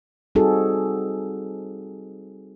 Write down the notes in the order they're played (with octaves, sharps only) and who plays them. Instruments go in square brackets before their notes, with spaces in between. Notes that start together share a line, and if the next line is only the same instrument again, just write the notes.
[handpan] G3 C4 D#4 F#4 G#4 A4